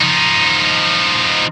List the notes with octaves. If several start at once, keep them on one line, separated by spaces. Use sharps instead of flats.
F3 D#4